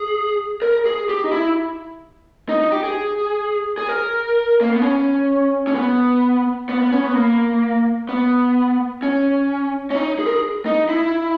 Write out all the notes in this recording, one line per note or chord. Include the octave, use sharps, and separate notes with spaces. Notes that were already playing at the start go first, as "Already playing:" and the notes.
Already playing: G#4
A#4
G#4
G4
D#4
E4
D#4
D#4
G4
G#4
G#4
A#4
A#3
B3
C#4
C#4
B3
B3
B3
C#4
B3
A#3
B3
C#4
C#4
D#4
G#4
A#4
G#4
D#4
E4